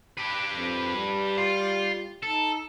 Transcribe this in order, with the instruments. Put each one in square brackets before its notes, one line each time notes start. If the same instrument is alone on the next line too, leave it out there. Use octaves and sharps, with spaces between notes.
[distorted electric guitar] G4 B4
[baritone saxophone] F2
G3
[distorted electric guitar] F4
[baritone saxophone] D#4 [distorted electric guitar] A4